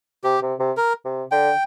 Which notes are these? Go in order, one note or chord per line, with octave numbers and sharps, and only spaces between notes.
C3 G4
C3
C3
A#4
C3
D3 G5